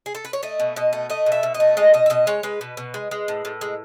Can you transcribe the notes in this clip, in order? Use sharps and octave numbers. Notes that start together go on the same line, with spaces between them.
G#4
A4
B4
C#5
A3 D#5
B2
B2 D#5
A3
A3 D#5
B2
E5
B2
D#5
A3
G#3 D#5
B2 D#5
E5
B2 D#5
G#3 C#5
G#3 B4
B2
B2
G#3
G#3
A2
A2
G#3